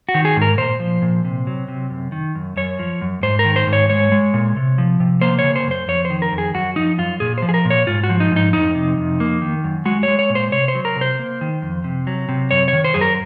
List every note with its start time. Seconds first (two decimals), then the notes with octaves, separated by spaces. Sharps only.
0.09 F#4
0.14 D#3
0.25 G#4
0.36 G#2
0.41 A#4
0.58 A#2 C5
0.80 F3
1.02 A#2
1.25 C3
1.47 F#3
1.68 C3
1.90 F#2
2.12 D#3
2.35 F#2
2.57 F#2 C#5
2.79 F3
3.01 F#2
3.23 G#2 C5
3.39 A#4
3.45 D#3
3.56 C5
3.67 G#2
3.73 C#5
3.89 G#3 C#5
4.12 G#3
4.34 A#2
4.56 C3
4.78 F3
5.00 C3
5.21 A#3 C5
5.39 C#3 C#5
5.56 C5
5.67 F#2 C5
5.88 F2 C#5
6.05 C5
6.10 D#3
6.22 A#4
6.32 F2
6.38 G#4
6.54 F#2 F#4
6.76 F3 D#4
6.98 F#2 F4
7.20 A#2 G#4
7.38 F3 C5
7.49 G#4
7.54 A#4
7.65 A#2
7.70 C#5
7.87 G#2 F4
8.04 F#4
8.09 F3
8.20 D#4
8.32 G#2 D#4
8.53 F2 D#4
8.75 C3
8.97 F2
9.20 A#3
9.42 D#3
9.64 F#2
9.85 G#3 F#4
10.03 C#5
10.08 G#3
10.19 C#5
10.30 A#2
10.35 C5
10.52 C3 C#5
10.68 C5
10.75 F#3
10.85 A#4
10.96 C3
11.01 C5
11.19 A#3
11.41 D#3
11.62 F2
11.84 C3
12.07 F#3
12.29 C3
12.51 F#2 C#5
12.68 C#5
12.73 D#3
12.84 C5
12.94 F#2 G#4
13.01 A#4